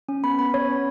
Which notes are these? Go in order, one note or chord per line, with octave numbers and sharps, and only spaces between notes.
C#4
B3 B5
B3 B5
C#4 C#5
C#4